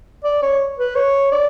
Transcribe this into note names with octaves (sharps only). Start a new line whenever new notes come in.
D5
C#5
B4
C#5
D5